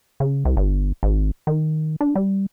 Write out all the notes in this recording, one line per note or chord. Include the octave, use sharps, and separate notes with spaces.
C#3
C2
G1
G#1
D#3
D4
G3